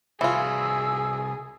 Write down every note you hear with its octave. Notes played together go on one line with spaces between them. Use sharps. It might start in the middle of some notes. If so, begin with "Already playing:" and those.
C2 E3 F4 F#4 G#4 E6